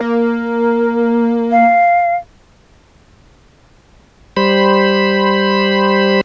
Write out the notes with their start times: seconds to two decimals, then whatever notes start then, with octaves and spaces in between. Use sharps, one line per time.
0.01 A#3 A#4
1.51 F5
4.37 G3 C5 B5